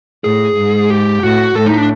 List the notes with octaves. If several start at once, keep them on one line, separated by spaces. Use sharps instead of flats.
A2 G#4
G#2
G4
A2 F#4
A2 A4
D#4
D4